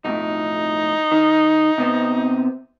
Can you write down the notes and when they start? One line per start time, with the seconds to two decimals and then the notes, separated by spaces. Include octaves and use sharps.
0.05 B1 F2 A2 D#4
1.12 D#3
1.78 C3 B3 C4